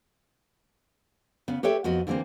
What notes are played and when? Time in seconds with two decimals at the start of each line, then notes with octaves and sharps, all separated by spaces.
1.48 C#3 B3
1.63 G4 A4 B4 C#5 E5 G5
1.84 F2 B3 F#4 D#5
2.07 D3 E3 A3 A#3 C4